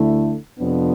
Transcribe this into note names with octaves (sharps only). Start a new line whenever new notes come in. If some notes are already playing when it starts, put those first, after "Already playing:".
Already playing: D2 D3 A3 E4
F2 C3 F3 B3 D4